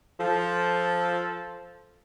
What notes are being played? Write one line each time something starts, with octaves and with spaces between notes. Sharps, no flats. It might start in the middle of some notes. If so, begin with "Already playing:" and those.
F3 A4